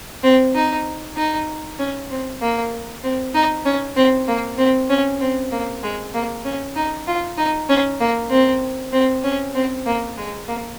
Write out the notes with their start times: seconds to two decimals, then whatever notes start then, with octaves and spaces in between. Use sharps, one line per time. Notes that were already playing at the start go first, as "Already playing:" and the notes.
0.24 C4
0.55 D#4
1.17 D#4
1.79 C#4
2.10 C4
2.41 A#3
3.03 C4
3.35 D#4
3.65 C#4
3.96 C4
4.28 A#3
4.58 C4
4.90 C#4
5.21 C4
5.52 A#3
5.83 G#3
6.14 A#3
6.45 C#4
6.76 D#4
7.07 F4
7.38 D#4
7.69 C#4
8.00 A#3
8.30 C4
8.93 C4
9.24 C#4
9.55 C4
9.86 A#3
10.17 G#3
10.48 A#3